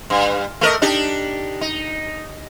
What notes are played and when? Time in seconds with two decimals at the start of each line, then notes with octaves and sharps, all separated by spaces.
0.10 G2
0.61 A3 A#4 D#5
0.82 D4 D#4 G4
1.61 D#4